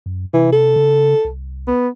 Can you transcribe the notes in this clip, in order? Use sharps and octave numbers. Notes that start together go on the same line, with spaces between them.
F#2
C3 E3
A4
C#3
C2
B3